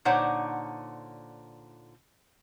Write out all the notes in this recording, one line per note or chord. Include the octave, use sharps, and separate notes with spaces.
A#2 D3 D#4 C5 C#5 F#5